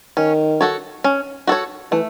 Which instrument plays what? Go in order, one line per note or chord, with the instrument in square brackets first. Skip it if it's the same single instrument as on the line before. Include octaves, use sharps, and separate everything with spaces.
[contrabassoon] D#3 [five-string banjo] C#4
[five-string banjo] F#4 A4 C#5
C#4
F#4 A4 C#5
[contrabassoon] E3 [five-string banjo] A3